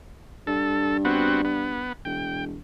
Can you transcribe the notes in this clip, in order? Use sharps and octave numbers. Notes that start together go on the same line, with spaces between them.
G2 A4
B3 C4 F#4
B3
E1 G5